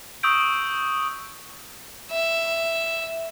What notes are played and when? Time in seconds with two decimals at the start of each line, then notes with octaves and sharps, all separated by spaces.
0.23 C#6 D#6 E6 G6 D7
2.11 E5